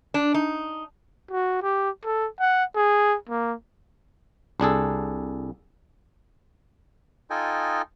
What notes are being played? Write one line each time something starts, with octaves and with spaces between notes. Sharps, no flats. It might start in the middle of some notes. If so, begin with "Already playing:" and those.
D4
D#4
F#4
G4
A4
F#5
G#4
A#3
C2 D4 G#4 A4
D#4 F4 A4 D#5 G5 G#5